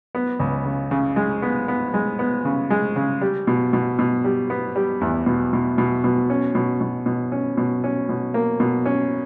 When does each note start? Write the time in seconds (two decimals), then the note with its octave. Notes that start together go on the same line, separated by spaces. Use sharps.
0.15 B3
0.40 C#2
0.65 C#3
0.91 C#3
1.16 G#3
1.42 B3
1.68 B3
1.94 G#3
2.19 B3
2.45 C#3
2.70 G#3
2.96 C#3
3.21 G3
3.47 B2
3.73 B2
3.99 B2
4.24 G3
4.50 B3
4.76 G3
5.01 E2
5.26 B2
5.53 B2
5.78 B2
6.04 B2
6.30 C#4
6.55 B2
6.81 B2
7.06 B2
7.32 C#4
7.57 B2
7.84 C#4
8.09 B2
8.34 A#3
8.60 B2
8.85 C#4